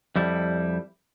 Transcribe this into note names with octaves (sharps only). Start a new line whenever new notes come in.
F2 G3 E4